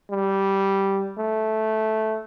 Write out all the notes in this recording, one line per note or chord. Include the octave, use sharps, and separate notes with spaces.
G3
A3